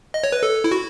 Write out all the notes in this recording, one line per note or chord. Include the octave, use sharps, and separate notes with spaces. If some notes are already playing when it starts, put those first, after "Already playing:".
D#5
C#5
B4
A4
E4
F#4